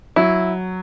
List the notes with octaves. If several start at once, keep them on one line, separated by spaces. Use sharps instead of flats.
F#3 E4